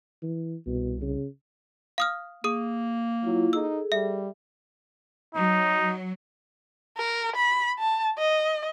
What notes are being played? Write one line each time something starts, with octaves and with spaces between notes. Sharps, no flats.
E3
C2 B2
C#3
F5 D#6 F6
A#3 G#4 D#6
F#3 E4 F4
D#4 G#4 A4 E6
G3 E5
F#3 D#4
A#4
B5
A5
D#5